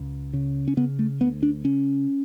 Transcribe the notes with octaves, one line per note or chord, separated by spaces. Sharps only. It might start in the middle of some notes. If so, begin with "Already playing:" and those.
Already playing: C#2
C#3
C#4
C#3 B3
A3
D2 B3
D4
C#3 C#4